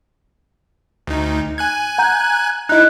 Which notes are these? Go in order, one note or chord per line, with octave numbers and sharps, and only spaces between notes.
D2 D#4
G#5 F#6 G#6
F#5 A#5 G6
D#4 E4 D#5 F#6